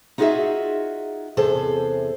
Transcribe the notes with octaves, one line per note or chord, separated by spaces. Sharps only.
D#4 F4 F#4 G#4 D#5 E5
E2 C3 G#4 A4 C5